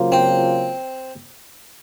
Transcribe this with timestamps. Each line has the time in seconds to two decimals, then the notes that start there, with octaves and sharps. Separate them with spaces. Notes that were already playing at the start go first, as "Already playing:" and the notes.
Already playing: C#3 F#3 A#3 F4 C5
0.12 C4